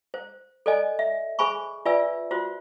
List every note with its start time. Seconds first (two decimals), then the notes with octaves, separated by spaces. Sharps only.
0.14 C5
0.66 A4 C5 D5 D#5 G#5
0.99 E5
1.39 G#4 C5 G#5 B5 C#6
1.85 F4 B4 D5 E5 G#5 E6
2.31 F4 F#4 C5